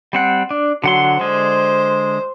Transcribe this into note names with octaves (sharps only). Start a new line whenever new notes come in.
G3 C4 F#5
D4
D3 F#3 F#5 C6
D3 G#3 C5